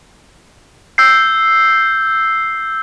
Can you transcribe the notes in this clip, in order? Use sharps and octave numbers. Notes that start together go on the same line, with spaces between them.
E6 G6 C7